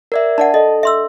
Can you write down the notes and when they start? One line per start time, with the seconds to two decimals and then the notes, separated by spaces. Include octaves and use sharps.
0.12 A#4 D5 E5
0.38 D4 D5 F#5 A5
0.54 A4 D#5
0.83 E5 C6 E6